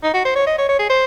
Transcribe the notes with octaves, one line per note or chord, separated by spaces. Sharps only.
D#4
F#4
C5
C#5
D#5
C#5
C#5
G#4
C5